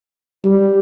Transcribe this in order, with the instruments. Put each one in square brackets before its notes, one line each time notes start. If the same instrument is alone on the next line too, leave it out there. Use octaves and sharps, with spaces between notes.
[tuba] G3